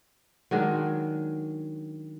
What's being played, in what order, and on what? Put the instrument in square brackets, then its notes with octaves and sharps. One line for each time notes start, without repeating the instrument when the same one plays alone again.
[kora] D#3 F#3 G#3 D4